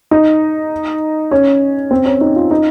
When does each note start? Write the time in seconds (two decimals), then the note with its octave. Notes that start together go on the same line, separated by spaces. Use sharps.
0.11 D#4
1.31 C#4
1.91 C4
2.06 C#4
2.21 D#4
2.36 F4
2.51 D#4